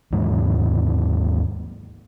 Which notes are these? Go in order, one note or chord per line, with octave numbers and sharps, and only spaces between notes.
D#2 G#2 E3 G#3